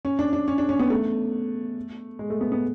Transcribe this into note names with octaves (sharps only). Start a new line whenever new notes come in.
C#4
D4
D4
C#4
D4
C#4
B3
A3
G#3
A3
B3
B3